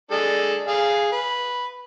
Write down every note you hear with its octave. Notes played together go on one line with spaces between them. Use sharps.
G#3 D4 A4
G#4 F5
B4